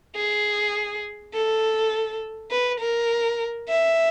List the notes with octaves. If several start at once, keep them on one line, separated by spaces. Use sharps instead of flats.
G#4
A4
B4
A#4
E5